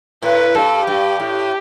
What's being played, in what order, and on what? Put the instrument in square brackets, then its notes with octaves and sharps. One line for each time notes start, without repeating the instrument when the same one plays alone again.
[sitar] A2 [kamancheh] B4
[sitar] G2 [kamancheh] A4
[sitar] G2 [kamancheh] G4
[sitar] A2